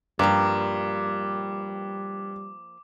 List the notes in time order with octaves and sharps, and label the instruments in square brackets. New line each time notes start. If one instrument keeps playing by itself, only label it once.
[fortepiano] G2 [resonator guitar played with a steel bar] F3 A#3 [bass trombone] G3 [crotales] D6